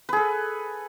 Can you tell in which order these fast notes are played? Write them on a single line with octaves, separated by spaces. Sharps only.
B4 G#4 A4